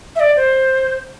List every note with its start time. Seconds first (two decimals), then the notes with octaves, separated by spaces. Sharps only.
0.16 E5
0.20 D5
0.36 C5